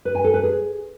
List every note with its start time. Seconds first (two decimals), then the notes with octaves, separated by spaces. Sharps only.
0.05 B4
0.15 G#5
0.24 A4
0.34 B4
0.43 G#4